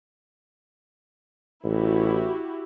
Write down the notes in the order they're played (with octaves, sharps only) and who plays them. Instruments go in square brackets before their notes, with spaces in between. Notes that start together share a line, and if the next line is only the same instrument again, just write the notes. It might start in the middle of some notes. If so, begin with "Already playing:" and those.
[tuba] A1 [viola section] E4 F#4 G4